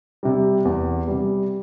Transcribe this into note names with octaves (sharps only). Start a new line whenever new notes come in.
C3 G3
E2
C3 G3